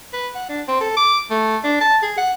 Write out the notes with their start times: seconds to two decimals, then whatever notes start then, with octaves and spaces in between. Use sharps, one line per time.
0.13 B4
0.35 F#5
0.49 D4
0.68 C4
0.81 A4
0.97 D6
1.31 A3
1.64 D4
1.81 A5
2.03 G#4
2.18 F#5